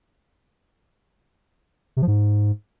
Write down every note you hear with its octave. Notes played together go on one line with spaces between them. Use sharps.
C3
F3
G#2